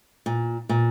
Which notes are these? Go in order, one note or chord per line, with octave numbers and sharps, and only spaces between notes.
A#2
A#2